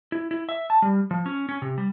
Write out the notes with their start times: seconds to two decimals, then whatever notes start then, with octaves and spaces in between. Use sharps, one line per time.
0.12 E4
0.31 E4
0.49 E5
0.70 A5
0.82 G3
1.11 F3
1.26 C#4
1.49 C#4
1.62 C3
1.78 G3